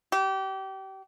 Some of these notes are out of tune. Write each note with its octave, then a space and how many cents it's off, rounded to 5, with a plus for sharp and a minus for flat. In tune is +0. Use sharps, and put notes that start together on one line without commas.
G4 -30